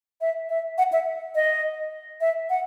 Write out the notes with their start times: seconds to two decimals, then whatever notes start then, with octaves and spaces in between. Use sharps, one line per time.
0.21 E5
0.50 E5
0.78 F#5
0.92 E5
1.35 D#5
2.21 E5
2.50 F#5